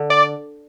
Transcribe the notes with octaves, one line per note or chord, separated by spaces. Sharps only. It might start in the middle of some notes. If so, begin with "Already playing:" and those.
Already playing: D3
D5